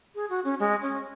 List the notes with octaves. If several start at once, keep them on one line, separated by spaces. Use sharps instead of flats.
G#4
F#4
C#4
G#3
C#4